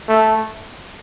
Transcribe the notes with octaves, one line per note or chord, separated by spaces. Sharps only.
A3